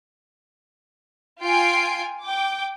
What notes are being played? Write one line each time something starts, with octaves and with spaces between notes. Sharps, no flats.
F4 G5 G#5 C7 D7
G5 D6